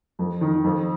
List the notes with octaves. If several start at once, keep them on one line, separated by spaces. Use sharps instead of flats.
F2
D#3
F2